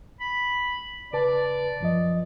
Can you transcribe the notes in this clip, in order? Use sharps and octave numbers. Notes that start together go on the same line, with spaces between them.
B5
C#3 B4 D5 A5
F#2 F3 D#5